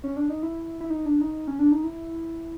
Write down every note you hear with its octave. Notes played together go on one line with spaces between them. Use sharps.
C#4
D4
D#4
E4
E4
D#4
D4
D#4
C#4
D4
D#4
E4